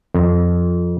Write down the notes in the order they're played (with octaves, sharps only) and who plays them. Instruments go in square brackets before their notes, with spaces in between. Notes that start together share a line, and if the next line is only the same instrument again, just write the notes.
[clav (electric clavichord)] F2